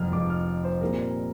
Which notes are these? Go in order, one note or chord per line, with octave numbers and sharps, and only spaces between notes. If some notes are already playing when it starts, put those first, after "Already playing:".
Already playing: F1 F2 F3 F6
F1 F2 F3 D6
F6
C5
A#2 G3 C4 A#4